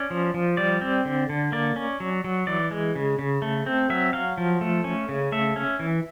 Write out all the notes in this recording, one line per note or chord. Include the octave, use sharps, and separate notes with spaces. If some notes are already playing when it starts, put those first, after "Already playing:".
Already playing: C#4 D5
F3
F3
G3 D5
C4
D3
D3
A#3 D5
C#4
F#3
F#3
E3 D5
G#3
C#3
C#3
A3
C4
F#3 E5
F#3 F5
F3
A3
C#4
C#3
A3 E5
C#4
E3